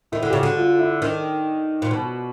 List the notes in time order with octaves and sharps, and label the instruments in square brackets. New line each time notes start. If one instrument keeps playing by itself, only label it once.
[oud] D#3 [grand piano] E4
[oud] D3
[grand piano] G4
[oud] C#3 [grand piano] F#4
[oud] D3
[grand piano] F4
E4
[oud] D#3 [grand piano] D4
[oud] A#2
B2